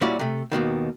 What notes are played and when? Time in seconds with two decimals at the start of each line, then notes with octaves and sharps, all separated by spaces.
0.01 A#2 G3 C#4 E4 F#4 D5
0.19 C3 A3
0.52 D#2 G#2 B2 D#3